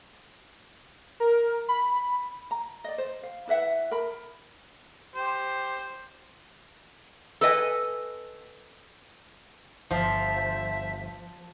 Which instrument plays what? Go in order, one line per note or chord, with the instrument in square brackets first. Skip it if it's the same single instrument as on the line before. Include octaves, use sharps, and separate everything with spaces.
[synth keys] A#4
B5
[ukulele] A#5
D5 D#5
C5
F5
E4 B4 E5 F#5
A#4 B5
[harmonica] G4 C5
[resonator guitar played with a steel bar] A4 B4 D#5 G#5
[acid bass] G1 [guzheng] F3 [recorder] E5